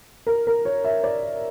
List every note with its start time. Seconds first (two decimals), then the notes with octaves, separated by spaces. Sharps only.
0.27 A#4
0.47 A#4
0.65 C#5
0.84 E5
1.04 D5